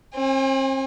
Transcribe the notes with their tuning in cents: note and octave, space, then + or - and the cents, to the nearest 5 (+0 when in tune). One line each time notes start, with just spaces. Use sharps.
C4 +40 G#5 -25